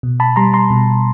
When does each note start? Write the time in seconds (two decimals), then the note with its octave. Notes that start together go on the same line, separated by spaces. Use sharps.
0.03 B2
0.20 A5 B5
0.36 G3 A#5 C6
0.53 A#5 C6
0.70 B2